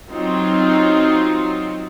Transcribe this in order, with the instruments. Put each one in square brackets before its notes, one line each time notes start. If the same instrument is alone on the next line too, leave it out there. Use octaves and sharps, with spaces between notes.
[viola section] F#3 C4 D#4 F4